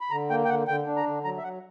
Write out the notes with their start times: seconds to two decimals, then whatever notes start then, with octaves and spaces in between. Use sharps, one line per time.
0.01 B5
0.11 D3 A#5
0.30 A#3 G5
0.45 G5
0.49 D3 F#5
0.68 D3 G5
0.87 D4
0.96 A#5
1.06 D3
1.24 F#3 A#5
1.37 E5
1.43 F#3 F#5